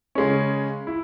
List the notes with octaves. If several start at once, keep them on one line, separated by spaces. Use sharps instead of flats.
C#3 G#3 C#4
E4